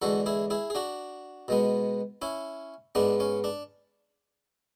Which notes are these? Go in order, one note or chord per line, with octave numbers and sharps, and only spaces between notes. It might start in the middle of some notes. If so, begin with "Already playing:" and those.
E2 D3 G#3 F#4 A4
E4 G#4
E4 G#4
G#4
D4 F#4
B2 G#3 B3
C#4 E4
G#2 G#3 B3 D4
C#4
D4